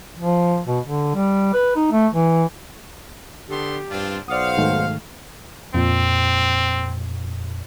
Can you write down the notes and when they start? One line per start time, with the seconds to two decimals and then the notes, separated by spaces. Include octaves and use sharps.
0.19 F3
0.67 B2
0.86 D3
1.15 G3
1.54 B4
1.76 D#4
1.92 A3
2.13 E3
3.49 D3 B3 G4 A4 C6
3.91 G2 C4 D4 F4
4.28 B1 C5 D5 F5 F#5 D#6
4.58 G#2 D#3 A3
5.74 F2 A#2 C4